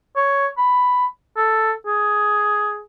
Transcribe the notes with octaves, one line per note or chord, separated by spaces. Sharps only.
C#5
B5
A4
G#4